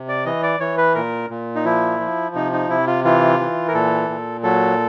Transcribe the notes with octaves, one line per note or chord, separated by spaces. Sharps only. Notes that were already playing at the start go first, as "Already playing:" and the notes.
Already playing: C3
D5
E3 D#5
D5
E3 C#5
B4
A#2 A#4
A#2
D#4
F3 E4
F3
C3 D#4
D#4
C3 E4
F4
E3 F4
E3
A#4
A#2 A4
A#2
F#3 A4